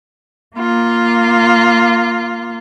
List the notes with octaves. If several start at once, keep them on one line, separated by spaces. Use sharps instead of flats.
A#3 F4